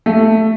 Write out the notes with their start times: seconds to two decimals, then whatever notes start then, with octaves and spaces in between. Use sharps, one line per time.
0.06 A3